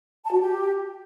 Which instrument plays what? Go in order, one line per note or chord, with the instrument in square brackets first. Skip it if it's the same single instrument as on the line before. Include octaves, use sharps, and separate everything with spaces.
[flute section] A5
F#4
G4